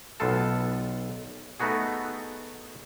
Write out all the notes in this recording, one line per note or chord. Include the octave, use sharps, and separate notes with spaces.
B1 A3 B3 F4 A4 A5
A3 B3 D#4 F#4 G#4